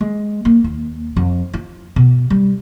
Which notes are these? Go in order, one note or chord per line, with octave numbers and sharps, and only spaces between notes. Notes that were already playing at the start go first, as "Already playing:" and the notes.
G#3
A#3
D#2
F2
F4
B2
G3